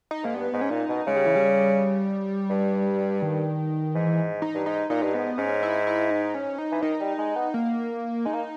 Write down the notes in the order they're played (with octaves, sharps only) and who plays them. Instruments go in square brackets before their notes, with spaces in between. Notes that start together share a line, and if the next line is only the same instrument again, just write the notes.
[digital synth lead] D#4
[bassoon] G#2 [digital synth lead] A#3
[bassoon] G2 [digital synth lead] B3
[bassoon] G#2
[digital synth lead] C#4
[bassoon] A#2 [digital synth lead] D#4
[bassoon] B2
[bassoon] C#3 [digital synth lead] G#3
[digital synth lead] G3
E3
G3
[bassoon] G2
[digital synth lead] D#3
[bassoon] G#2 [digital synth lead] E3
[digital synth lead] D#4
[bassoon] G2
[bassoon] G#2 [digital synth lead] D#4
[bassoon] A#2 [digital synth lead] D#4
[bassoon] G2
[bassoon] G#2 [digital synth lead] B3
[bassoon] G#2 [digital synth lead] C#4
[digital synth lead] E4
E4
D#4
C#4
D#4
[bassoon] E3
[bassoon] D#3 [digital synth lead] D#4
[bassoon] G3
G#3
B3
[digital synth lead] A#3
[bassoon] G#3 [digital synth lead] D#4
[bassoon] A#3